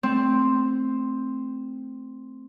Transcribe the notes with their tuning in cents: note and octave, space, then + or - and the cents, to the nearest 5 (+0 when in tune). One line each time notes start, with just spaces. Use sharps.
A3 +0 C4 +0